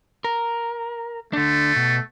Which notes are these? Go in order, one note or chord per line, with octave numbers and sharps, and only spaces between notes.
A#4
D3 A3 D4
B2